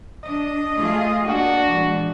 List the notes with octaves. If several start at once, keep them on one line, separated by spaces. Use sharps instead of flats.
D4 D#5
A3 F4 G#4
A#3 D4 F#4
A#2 E3 G#3